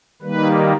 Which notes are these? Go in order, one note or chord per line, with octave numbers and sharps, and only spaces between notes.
D#3 G3 A#3 B4